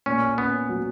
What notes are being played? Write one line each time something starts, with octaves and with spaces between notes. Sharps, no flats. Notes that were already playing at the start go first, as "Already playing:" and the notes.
A#2 C#4
B3 C#4
F#3